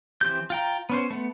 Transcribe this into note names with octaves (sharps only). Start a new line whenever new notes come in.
E3 C4 G4 G6
F4 G5 A#5
B3 C#4 C5
A3 B3